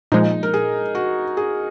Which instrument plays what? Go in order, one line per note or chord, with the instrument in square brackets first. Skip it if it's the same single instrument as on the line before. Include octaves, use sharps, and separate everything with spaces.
[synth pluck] A#2 F3 G#3 [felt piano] D#4
[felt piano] A#4
G#4
F#4
G#4